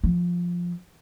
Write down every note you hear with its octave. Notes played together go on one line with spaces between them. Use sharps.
F3